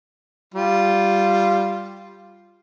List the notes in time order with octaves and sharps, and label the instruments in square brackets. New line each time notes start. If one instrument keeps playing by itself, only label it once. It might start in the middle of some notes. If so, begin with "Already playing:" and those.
[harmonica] G3 F4